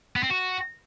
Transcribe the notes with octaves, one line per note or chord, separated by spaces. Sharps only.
B3
C4
F#4